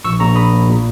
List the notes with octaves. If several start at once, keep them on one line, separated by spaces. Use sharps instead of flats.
A#1 C#6 E6
A#1 A#5 C#6
A#1 B5 D#6
A#1
A#2